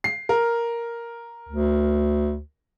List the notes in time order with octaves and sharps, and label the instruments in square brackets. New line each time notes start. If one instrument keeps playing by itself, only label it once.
[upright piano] C7
A#4
[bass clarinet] D2